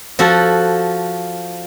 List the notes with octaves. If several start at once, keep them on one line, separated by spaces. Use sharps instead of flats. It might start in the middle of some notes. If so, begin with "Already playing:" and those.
F3 F#4 A4